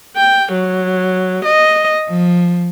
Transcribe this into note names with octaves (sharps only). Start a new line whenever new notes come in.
G5
F#3
D#5
F3